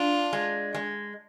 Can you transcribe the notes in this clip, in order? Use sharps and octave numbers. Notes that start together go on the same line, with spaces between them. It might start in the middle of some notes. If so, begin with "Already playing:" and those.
Already playing: D4 F4
G#3
G#3